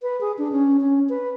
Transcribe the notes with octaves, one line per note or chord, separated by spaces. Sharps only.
B4
G#4
D4
C#4
C#4
B4